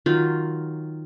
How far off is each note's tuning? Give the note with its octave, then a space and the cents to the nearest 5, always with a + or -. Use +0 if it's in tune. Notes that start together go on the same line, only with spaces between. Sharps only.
D#3 +0 F#3 +0 F4 +0